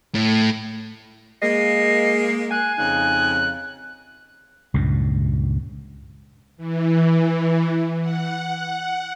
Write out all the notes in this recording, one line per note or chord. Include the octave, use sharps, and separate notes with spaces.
A2
G#3 A#3 D#5 C7
G#5 F#6
F2 C#3 D#4 F#6
C#2 G2 A#2
E3
F#5